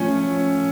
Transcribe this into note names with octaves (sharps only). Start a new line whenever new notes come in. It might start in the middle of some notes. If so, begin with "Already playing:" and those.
Already playing: F3 A3 C#4